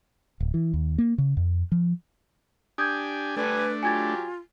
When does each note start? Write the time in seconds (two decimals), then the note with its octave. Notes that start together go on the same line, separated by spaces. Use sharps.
0.40 D1
0.54 E3
0.73 D#2
0.98 A#3
1.18 C#3
1.37 F2
1.72 F3
2.78 D4 G4 G#5 D#6 G6 G#6
3.36 D3 G3 A3 D4 B4 G#5
3.83 F#3 F4 G4 G#5 G#6 A6